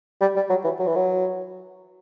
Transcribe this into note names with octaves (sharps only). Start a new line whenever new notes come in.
G3
G3
F#3
E3
F#3
E3
F#3